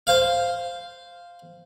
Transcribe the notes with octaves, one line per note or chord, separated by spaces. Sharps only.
C5 F5